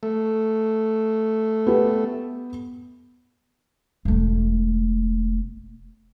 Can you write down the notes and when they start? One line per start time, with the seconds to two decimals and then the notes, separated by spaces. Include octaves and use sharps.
0.03 A3
1.67 B3 G4
4.05 E1 A3